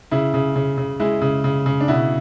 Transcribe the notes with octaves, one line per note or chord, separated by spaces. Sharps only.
C#3 E4
C#3
C#3
C#3
G#3 E4
C#3
C#3
C#3
D4
B2 E4